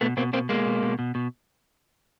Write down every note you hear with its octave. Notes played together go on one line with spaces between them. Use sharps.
B2 A3 B3
B2 A#3 C4
B2 A#3 C4
B2 G#3 A#3
B2
B2
B2
B2